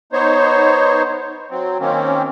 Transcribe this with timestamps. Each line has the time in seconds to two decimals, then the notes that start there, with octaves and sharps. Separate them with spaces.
0.12 B3 D#4 C5 C#5
1.51 F#3 C4
1.80 D#3 A#3 C4 C#4